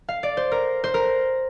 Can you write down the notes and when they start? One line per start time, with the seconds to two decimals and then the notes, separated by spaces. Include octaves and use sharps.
0.09 F5
0.23 D5
0.37 C5
0.52 A#4
0.84 C5
0.94 A#4